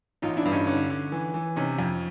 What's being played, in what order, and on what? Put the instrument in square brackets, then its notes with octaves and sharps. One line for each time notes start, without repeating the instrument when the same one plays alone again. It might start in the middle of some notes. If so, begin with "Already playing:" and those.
[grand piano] A1 [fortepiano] D#4 F4
[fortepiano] D4 E4
[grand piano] G2
[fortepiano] C#4 D#4
[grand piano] D3 [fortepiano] C#4 D#4
[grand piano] D3
E3
E3
[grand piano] C3 [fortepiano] C#4 D#4
[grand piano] F2